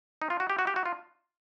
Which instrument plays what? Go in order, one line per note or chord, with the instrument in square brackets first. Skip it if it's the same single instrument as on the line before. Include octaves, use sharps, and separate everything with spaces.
[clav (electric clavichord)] D#4
F4
F#4
G4
F#4
G4
F#4
F4